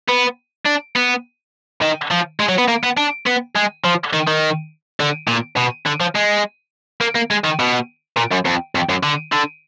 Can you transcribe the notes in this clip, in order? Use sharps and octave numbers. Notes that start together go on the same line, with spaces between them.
B3
D4
B3
D#3
F3
G#3
F#3
B3
A#3
B3
D4
B3
G#3
F3
D#3
D#3
D3
A#2
B2
D3
F3
G#3
A#3
A#3
G#3
D#3
B2
A#2
F#2
F2
F2
F#2
D3
D3